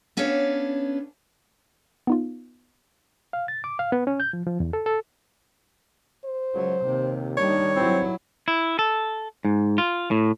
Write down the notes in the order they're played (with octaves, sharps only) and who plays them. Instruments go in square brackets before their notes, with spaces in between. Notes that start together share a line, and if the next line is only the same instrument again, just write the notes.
[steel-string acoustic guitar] B3 C#4 D4 A4 C#5 F5
[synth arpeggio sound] B3 D#4 F4
[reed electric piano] F5
A6
D6
F5
B3
C#4
G6
F3
F3
E2
A4
A4
[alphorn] C5
[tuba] C#2 [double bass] F#3
[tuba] D#2 [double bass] C3
[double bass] D#3 G3 [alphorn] D4 [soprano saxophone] C#5
[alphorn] G2 [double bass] F#3 E4 [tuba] C4
[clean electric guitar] E4
A4
G#2
F4
A2